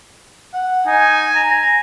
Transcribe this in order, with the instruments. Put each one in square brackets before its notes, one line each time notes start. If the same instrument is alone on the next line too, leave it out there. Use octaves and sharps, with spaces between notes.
[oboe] F#5
[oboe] D#4 [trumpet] G#5
[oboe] A#5